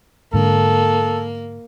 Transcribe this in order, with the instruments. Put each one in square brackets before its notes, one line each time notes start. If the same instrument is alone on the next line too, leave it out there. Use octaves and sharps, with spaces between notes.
[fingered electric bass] G#2 D3 [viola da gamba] A#3 [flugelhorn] A4